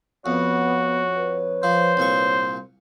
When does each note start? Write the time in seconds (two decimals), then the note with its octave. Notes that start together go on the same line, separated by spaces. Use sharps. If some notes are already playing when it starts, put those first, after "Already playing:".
0.26 F2 B3 F#4 C#5
1.16 B4
1.63 F3 C5
1.97 C2 A#2 C#6